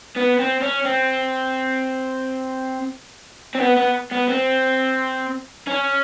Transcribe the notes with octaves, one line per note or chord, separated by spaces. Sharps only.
B3
C4
C#4
C4
C4
B3
B3
B3
C4
C#4